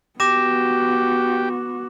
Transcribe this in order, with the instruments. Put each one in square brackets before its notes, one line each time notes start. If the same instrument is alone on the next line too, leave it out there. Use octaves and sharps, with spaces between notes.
[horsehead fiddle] B3 F#4 [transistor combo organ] G4 [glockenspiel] D6 A#6 E7